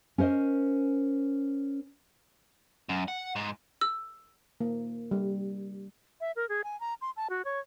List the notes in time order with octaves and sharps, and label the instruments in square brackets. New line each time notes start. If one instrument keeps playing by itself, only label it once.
[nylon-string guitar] C#4 A#4 C5 D#5
[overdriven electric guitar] F#2
F#5
G#2
[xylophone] E6
[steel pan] A#3
G3
[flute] E5
A#4
G#4
G#5
A#5
C6
A5
F#4
C#5